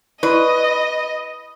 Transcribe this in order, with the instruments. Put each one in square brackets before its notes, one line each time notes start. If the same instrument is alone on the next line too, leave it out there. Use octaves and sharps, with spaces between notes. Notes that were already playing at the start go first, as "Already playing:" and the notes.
[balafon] E4 D5 [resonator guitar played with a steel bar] B4 [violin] D#5